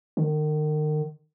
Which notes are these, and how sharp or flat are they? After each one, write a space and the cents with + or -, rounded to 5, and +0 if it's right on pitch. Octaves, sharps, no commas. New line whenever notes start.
D#3 -35